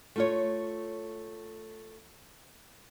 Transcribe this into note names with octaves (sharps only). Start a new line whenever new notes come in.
A3 F4 C#5